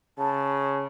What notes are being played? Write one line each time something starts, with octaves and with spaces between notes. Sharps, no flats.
C#3 A5